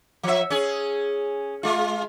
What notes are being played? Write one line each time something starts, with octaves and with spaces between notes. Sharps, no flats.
F3 E5
C#4 G#4
G#3 F4